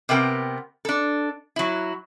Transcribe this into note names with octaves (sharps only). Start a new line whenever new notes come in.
C3 B3 C4 A#4 G5
D4 A4
F#3 E4